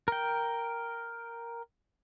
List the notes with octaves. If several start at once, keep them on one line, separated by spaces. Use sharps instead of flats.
A#4 G5